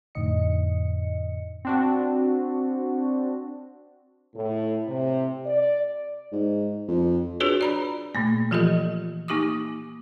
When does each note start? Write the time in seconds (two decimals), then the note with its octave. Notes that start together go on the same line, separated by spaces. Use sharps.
0.15 F2 A2 D3 D#4 D#5 C#7
1.65 C4 D4 F#4
4.35 A2
4.87 C3
5.46 D5
6.32 G#2
6.89 F2
7.40 D4 F4 F#4 G#4 B4 C#5
7.61 D5 A#5 B5
8.15 A#2 A3 A#3
8.51 E3 F3 F4 G4 A4 D#5
9.28 A#3 D#4 G4 D6 D#6